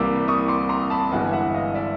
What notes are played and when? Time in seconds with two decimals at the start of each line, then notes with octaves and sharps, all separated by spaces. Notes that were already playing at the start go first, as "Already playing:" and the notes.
Already playing: C2 C3 E3 G3 A#3 D6 E6
0.28 C#6 D#6
0.48 C6 D6
0.69 A#5 C6
0.90 A5 B5
1.11 G1 G2 E3 G#3 F#5 G#5
1.33 E5 F#5
1.54 D#5 F5
1.74 D5 E5